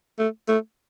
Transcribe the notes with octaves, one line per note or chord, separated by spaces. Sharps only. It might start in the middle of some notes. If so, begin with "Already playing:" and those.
A3
A3